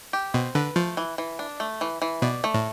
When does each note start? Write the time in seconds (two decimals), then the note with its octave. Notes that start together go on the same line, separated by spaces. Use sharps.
0.13 G4
0.34 B2 C4
0.55 D3 B4
0.76 F3 A3
0.97 E3
1.18 E3
1.39 D4
1.60 A3
1.81 E3
2.02 E3
2.22 B2 D5
2.44 A3
2.54 A2